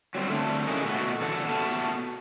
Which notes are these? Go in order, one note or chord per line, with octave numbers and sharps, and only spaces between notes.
F#3 G3 C4
D3 A3 C4 D4
C#3 E3 F#3 D#4 G#4 A#4
B2 A3 F#4
E2 A4 F#5
A3 B3 F#4 A5